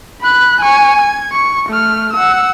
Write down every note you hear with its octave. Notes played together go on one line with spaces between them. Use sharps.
B5 F#6
G#5 C#6
G#6
C#6
A3 F6
F#5 E6